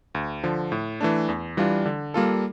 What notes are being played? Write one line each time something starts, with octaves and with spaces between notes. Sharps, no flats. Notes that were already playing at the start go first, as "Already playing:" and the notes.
D2
D3 F3
A2
E3 A3 D4
E2
E3 G3 D4 F4
D3
G3 A#3 F4 A4